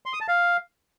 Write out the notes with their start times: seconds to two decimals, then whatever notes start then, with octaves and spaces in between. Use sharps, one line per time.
0.06 C6
0.13 D#6
0.21 A5
0.28 F5